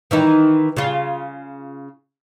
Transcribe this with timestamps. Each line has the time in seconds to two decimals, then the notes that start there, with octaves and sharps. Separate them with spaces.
0.11 D#3 E3 D#4
0.76 C#3 F4